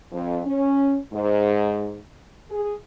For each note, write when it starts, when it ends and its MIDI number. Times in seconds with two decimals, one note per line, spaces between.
0.12 0.41 41
0.46 0.97 61
1.13 1.99 44
2.51 2.75 68